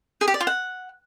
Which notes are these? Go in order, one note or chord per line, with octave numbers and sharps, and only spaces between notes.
G#4
G4
D5
F4
F#5